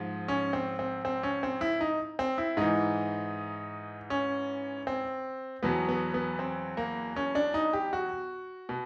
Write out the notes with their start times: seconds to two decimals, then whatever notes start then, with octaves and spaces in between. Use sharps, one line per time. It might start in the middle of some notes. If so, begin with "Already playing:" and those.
Already playing: G#2 F3
0.28 C#4
0.53 C4
0.79 C4
1.05 C4
1.23 C#4
1.43 C4
1.61 E4
1.81 D#4
2.19 C4
2.38 E4
2.57 G#2 E3 D#4
4.10 C#4
4.87 C4
5.63 E2 B2 F#3 B3
5.89 B3
6.14 B3
6.39 C4
6.77 A#3
7.16 C#4
7.35 D4
7.54 D#4
7.73 G4
7.93 F#4
8.69 B2